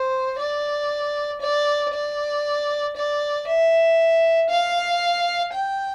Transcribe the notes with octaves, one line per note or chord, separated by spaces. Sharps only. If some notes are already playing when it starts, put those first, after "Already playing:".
Already playing: C5
D5
D5
D5
D5
E5
F5
G5